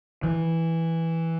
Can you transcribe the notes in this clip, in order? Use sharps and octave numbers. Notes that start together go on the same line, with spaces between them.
E3